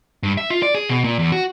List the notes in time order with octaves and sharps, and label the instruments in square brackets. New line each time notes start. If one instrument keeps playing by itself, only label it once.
[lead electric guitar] G2
E5
F4
D5
G#4
B2
A#2
E2
F#4